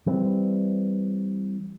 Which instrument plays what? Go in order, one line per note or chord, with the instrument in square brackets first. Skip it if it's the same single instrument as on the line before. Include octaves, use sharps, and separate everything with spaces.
[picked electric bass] E3 G3 C4